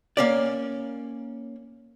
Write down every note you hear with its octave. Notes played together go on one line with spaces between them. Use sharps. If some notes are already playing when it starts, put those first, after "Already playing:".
A#3 C#4 D5